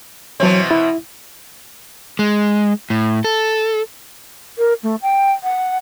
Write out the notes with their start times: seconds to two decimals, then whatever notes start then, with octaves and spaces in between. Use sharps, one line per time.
0.40 B2 E3 F#3 C4 C#5
0.71 E4
2.19 G#3
2.90 A2
3.24 A4
4.58 A#4
4.83 A3
5.02 G5
5.43 F#5